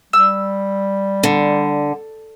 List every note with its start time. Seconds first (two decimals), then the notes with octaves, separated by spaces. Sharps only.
0.13 G3 E6
1.23 D3